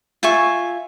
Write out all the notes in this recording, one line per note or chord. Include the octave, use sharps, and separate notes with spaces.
F4 E5 G#5 C#6